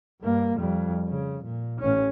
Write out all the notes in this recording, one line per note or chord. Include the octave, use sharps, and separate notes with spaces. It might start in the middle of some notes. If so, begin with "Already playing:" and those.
G2 A#3
F2 G3
C#3
A#2
A1 C#4